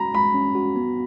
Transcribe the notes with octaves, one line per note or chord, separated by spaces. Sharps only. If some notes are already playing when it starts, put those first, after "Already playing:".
Already playing: G#3 C#4 F#4 A#5 B5
G#3 B5
C#4
F#4
B3